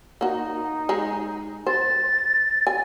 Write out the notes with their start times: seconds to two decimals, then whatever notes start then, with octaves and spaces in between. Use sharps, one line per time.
0.21 A#3 D#4 F#4
0.89 G#3
1.67 C5 A6
2.67 G#5